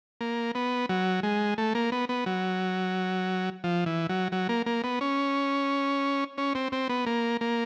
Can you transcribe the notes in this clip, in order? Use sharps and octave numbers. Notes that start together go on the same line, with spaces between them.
A#3
B3
F#3
G#3
A3
A#3
B3
B3
F#3
F3
E3
F#3
F#3
A#3
A#3
B3
C#4
C#4
C4
C4
B3
A#3
A#3